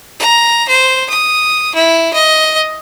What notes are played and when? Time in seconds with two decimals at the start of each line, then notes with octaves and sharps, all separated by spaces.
0.20 A#5
0.69 C5
1.10 D#6
1.75 E4
2.14 D#5